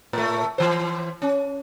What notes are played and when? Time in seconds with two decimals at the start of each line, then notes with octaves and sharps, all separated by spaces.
0.13 A2 A3
0.58 E3 C5
1.22 C#4